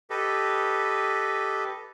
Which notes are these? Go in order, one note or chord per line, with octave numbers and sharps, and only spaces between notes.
G4 A4 B4 D#5